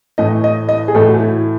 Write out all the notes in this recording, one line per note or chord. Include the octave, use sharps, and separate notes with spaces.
A2 E3 A3 D#5
D#5
D#5
G#4
A2 E3 A3 A4
F#4
E4